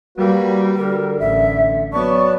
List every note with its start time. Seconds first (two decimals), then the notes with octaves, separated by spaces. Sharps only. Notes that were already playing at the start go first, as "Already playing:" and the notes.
0.18 G3 A#3 F#4 B4
0.77 D3 A#4
1.19 A1 E5
1.93 F#3 B3 D5 A5 C#6